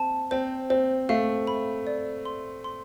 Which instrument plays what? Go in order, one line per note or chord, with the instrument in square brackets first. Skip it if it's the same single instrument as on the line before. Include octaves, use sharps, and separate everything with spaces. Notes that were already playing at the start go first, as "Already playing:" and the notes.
Already playing: [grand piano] C4 [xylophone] A5
[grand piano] C4 [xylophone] C5
[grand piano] C4 [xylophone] C5
[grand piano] A3 [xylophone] F5
[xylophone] B5
D5
C6
C6